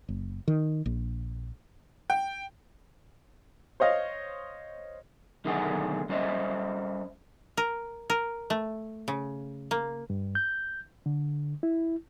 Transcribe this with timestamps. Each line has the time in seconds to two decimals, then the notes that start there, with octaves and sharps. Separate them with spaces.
0.09 F#1
0.48 D#3
0.86 A#1
2.10 G5
3.80 C5 C#5 D#5 F5
5.45 B1 D3 D#3 A3 G#4 F#5
6.09 G3 C#4 C5 D#5 E5
7.57 A#4
8.10 A#4
8.50 A3
9.08 C#3
9.71 A#3
10.10 G2
10.35 G6
11.06 D3
11.63 E4